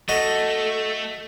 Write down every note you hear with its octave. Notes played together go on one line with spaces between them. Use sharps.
A3 F#4 A4 D#5